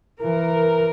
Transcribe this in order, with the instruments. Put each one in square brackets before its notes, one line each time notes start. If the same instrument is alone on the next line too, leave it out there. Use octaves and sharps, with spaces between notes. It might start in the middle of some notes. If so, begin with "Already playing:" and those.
[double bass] E3 [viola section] A#4